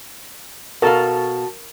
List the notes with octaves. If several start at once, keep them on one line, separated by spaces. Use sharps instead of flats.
B2 F#4 A4 A#4 F5 A5